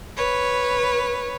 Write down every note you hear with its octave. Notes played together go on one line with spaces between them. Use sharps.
B4 C#5